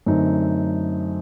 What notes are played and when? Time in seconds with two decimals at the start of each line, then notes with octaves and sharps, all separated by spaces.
0.06 F#2 D3 A3 C4 D#4